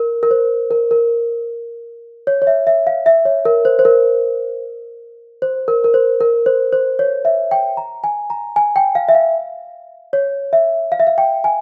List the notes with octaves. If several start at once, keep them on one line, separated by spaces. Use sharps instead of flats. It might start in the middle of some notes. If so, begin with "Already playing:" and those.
Already playing: A#4
A#4
C5
A#4
A#4
C#5
C#5
E5
E5
F5
E5
C#5
A#4
C5
C5
A#4
C5
A#4
A#4
C5
A#4
C5
C5
C#5
E5
G5
A#5
G#5
A#5
G#5
G5
F5
E5
F5
C#5
E5
F5
E5
F5
G5
G#5